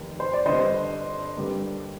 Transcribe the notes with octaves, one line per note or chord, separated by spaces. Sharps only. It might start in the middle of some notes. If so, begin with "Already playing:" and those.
Already playing: F1 D#2 D#3
C5
D5
G1 G2 D3 C5 D#5
G2 D3 G3 A#3